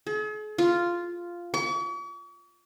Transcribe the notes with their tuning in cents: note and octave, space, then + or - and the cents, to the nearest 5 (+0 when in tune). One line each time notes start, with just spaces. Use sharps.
G#4 +45
F4 -5
C#6 +45